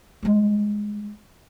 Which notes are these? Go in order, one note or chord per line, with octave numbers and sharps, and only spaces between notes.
G3 G#3